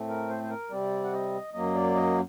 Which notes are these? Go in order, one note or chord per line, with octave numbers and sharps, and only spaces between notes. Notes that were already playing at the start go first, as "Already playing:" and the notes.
Already playing: A2 A3 C4
A#4
C5
C5
A#4
C3 G3 C4 D5
F#5
D#5
F#2 F#3 A#3 D#5
D5
D#5